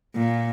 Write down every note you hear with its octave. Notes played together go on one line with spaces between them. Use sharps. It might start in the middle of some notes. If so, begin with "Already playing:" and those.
A#2